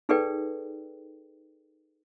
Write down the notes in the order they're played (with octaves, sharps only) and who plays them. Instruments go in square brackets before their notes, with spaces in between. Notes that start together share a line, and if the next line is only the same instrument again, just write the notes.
[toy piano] D#4 G#4 A4 B4 D5 G5